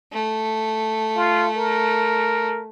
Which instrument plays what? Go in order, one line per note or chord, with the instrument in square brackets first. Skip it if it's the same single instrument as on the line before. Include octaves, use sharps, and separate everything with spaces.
[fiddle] A3
[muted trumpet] F4
A#4